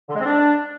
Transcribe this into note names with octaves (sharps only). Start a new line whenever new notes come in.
D3
G#3
C4
D4